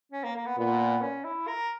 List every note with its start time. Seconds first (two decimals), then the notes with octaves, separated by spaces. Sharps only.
0.12 C#4
0.24 A#3
0.36 A#3
0.46 B3
0.57 A#2 B3
1.02 C#4
1.25 E4
1.48 A#4